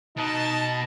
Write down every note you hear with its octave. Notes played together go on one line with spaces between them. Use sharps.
B2 D#4 D#5 A5